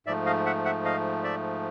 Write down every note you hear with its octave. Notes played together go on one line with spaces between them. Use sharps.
G#2 F3 A3 D5 E5
D#5 F5
E5 F#5
E5 F#5
D#5 F5
D5 E5